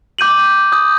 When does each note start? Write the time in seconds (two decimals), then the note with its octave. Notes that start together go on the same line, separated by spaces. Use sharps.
0.19 D6 G6 D#7 F#7
0.72 D#6 G6